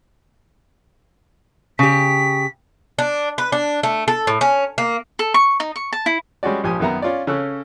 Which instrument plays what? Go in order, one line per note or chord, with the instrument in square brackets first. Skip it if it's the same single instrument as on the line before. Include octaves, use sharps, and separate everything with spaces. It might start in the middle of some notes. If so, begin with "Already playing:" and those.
[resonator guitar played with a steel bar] C#3 G4 [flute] B6
[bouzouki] D4
B4
D4
A3
A4
A2
C#4
A#3
[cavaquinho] A4
C#6
D#4
C#6
A5
E4
[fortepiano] G3 G#3 C#4 F#4 D5
A#1 F3 G4 G#5 D#6
F#2 D#3 B3 E5 A#5
C#4 F4 C#5 D5
C#3 C#4 A4 E6 F#6